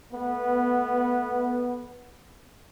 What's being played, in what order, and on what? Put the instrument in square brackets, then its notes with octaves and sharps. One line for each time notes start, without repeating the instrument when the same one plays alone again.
[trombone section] A3 B3